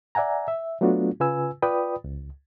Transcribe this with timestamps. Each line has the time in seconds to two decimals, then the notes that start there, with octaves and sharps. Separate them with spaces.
0.15 D5 E5 F#5 G#5 A#5
0.48 E5
0.81 F#3 A3 B3 D4 F4 F#4
1.20 C#3 F4 B4 G#5 E6
1.62 F4 B4 D5 G5 B5 D#6
2.04 C#2